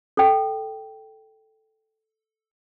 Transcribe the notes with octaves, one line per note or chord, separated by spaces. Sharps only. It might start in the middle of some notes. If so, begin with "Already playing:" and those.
A4 G5